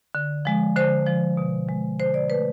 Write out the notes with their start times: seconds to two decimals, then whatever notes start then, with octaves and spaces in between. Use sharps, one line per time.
0.15 D3
0.45 F3 G#3
0.76 D3 C5
1.07 F3 G#3
1.37 B2
1.69 G#3
2.00 D3 C5
2.14 D5
2.30 A3 B4